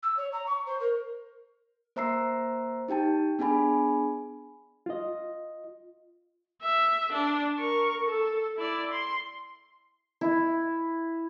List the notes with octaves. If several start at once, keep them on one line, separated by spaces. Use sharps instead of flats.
E6
C#5
A#5
C#6
C5
A#4
A#3 C5 E5 A#5 E6 C7
D#4 G4 G5 A5
B3 D4 G#4 G#5 B5
F4 D#5
E5
D4
A#4 C#6
A4
E4 D5
C6
E4